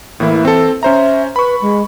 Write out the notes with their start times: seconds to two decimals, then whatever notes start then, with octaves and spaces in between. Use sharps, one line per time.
0.20 A2 E3 A#3 E4
0.45 C4 A4
0.83 C#4 C5 E5 A#5
1.36 B4 B5 C#6
1.62 G#3